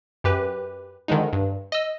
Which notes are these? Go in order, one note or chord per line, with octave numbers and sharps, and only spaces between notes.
F#2 G4 B4
D3 D#3 F3 G#3 D#4
G2
D#5 E6